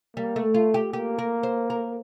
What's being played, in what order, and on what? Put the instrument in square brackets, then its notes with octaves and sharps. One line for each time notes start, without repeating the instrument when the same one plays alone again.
[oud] G3 [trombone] A#3
[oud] A3
[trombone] A3 [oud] F4
[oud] G4
[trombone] A#3 [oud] G4
[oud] A#4
C5
A#4